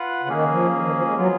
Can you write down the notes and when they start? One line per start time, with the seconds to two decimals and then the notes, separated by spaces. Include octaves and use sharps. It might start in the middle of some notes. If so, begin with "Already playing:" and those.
Already playing: F4 B4 F#5
0.23 C#3
0.29 D#3 A#3 C#4 G#4
0.51 F3
0.73 D#3
0.84 D#3
0.95 F3
1.06 G#3
1.17 F#3 B3 F4 G#4